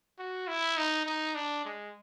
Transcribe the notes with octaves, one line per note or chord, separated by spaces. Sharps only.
F#4
E4
D#4
D#4
D4
G#3